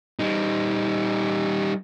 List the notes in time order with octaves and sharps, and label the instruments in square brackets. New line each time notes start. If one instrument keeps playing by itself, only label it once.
[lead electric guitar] G3 D#4